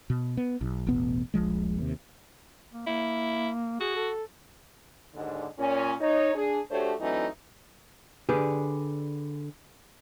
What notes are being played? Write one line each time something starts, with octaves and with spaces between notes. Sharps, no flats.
B2
B3
B1
E1 A1 B2 B3
D#1 A#1 F3 G#3
D#2 C3
A#3
A#3 E4
F#4 G#4
A4
D#2 G#2 D3
A#2 C#4
D#4 C#5
D4 G#4
A3 D4 F#4 G4 C5 C#5
E3 F#3 A3 C4 D4 D#4
D3 G4 G#4 B4 D5